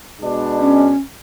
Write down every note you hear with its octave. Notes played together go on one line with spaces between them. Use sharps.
B2 G#3 D4
C#4